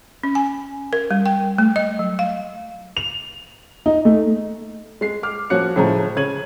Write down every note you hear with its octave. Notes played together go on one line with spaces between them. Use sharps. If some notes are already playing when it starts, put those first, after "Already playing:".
C#4
G#5
A#4
G3
G5
A3
D#5
F#3
F5
F7
D#4
A3
G#3 C7
D6 F6
F3 A#3 C#4 F#4 F#6 C#7
A2 C#3 F3 G#3 A#5
C#3 C#5 G#6 D#7 F#7